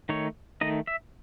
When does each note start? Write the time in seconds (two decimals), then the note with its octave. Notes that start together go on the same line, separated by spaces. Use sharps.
0.09 D#3 A3 D#4 C#5
0.61 D#3 A3 D#4 D#5
0.87 E5